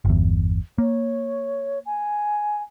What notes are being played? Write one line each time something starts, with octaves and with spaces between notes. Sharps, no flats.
G1 E2
A#3 C#5
G#5